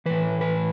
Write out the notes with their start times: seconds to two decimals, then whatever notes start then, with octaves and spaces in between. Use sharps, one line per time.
0.06 A2 E3 B4
0.41 B4